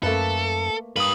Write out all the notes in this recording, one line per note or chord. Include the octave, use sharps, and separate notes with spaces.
F#2 A3 A#3 A4 B4
G2 A#3 A#4 B4 D#6 F#7